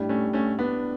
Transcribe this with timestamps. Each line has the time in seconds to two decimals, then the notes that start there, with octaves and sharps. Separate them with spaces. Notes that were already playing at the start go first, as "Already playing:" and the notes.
Already playing: A2 G3 D4 G4
0.09 A3 C#4
0.33 A3 C#4
0.58 B3 D4